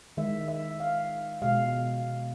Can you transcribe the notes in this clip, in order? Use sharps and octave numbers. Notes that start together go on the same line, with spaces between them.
D#3 G#3 E5
E5
F5
B2 G#3 F5